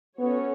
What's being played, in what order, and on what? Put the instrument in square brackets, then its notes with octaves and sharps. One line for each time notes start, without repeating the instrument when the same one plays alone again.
[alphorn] B3 [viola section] C#4 F#4 A4 C#5